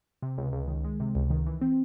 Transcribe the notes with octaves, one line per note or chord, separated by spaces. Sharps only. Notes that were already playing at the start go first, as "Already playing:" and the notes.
C3
C#2
C#2
D#3
G#3
C3
C#2
D#3
E3
C4